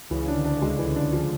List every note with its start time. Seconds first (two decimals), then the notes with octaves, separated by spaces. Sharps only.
0.10 C#2 C#3 E3
0.28 C#3 D4
0.35 D2 D3
0.45 D4
0.61 D2 D3 G#3
0.79 E3
0.96 D4
1.12 F3